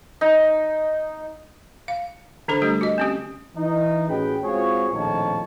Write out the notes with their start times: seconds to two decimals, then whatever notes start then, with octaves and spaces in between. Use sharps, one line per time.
0.21 D#4
1.88 F5
2.48 D3 D4 A4 C5 B5
2.62 G3 A3 D4 G4
2.81 F#4 D#5
2.98 C4 C#4 G4
3.55 E3 D#4
4.08 A1 C#4 F#4 G#4 B4 G5
4.43 G#3 C4 F4 F#4 G#4 C#5
4.92 A#1 F2 A2 D#3 C#5 A5